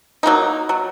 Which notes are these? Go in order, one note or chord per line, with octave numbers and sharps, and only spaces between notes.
F#3 A#3 D#4
F#3